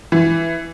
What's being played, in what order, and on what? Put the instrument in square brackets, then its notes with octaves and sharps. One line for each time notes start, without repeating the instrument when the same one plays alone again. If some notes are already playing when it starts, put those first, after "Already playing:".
[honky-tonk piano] E3